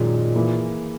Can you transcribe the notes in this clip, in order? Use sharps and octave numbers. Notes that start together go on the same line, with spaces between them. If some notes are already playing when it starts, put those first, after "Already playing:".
Already playing: F#2 A#2 D#3 G#3
E3 A#3 E4 G#4